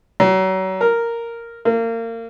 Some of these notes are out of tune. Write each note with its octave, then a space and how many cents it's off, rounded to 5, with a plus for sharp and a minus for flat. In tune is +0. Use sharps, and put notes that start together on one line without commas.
F#3 +35
A#4 -5
A#3 -30